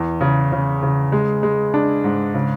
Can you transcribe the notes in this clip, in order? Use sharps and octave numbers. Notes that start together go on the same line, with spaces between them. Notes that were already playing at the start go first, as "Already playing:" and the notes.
Already playing: E2
C#3
C#3
C#3
G#3
G#3
D4
G#2
C#3